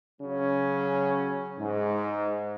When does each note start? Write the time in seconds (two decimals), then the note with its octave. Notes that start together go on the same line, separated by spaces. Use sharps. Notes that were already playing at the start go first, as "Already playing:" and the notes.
0.21 C#3 F#3 C#4
1.58 G#2